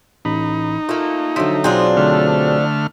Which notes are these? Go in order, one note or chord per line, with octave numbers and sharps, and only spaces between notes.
A1 D#4 B5
A3 A#3 F4
D3 F3 F#3 A3 E5
B1 F#3 C4 D4 F4 G#4
D3 A3 F6